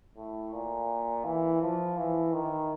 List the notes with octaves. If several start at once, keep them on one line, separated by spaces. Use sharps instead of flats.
A2
A#2
E3
F3
E3
D#3